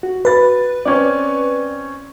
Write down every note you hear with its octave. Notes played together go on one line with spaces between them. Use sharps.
F#4
B4 B5 A6
C4 C#4 C#5 D5